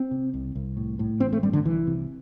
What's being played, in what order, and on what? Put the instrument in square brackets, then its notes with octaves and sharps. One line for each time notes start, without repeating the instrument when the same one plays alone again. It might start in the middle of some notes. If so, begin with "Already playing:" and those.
Already playing: [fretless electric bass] C4
C3
C2
C2
A2
A2
A1 C4
A3
G2 G3
D3
C2 E3
C3